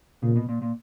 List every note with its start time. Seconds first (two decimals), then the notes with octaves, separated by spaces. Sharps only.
0.23 A#2 C#3
0.36 B2
0.49 A#2
0.62 A#2